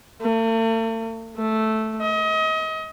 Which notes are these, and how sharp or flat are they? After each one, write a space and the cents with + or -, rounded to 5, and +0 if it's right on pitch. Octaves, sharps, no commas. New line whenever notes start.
A3 +45
A3 -5
D#5 +30